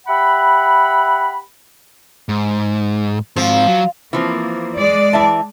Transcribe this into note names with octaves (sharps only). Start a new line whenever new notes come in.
G4 E5 F#5 B5
G#2
G#2 F3 C4
F#3
E3 F3 A#3 C4
G#3 D5
E3 E5 A5